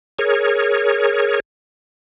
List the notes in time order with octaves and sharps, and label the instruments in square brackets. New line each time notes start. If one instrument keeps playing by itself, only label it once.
[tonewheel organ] G#4 A#4 C#5